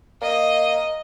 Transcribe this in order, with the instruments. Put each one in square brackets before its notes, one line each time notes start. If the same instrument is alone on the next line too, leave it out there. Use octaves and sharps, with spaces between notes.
[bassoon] A#3 [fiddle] D#5